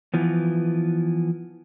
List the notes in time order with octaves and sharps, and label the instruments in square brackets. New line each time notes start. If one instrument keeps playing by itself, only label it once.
[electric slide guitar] E3 F3 B3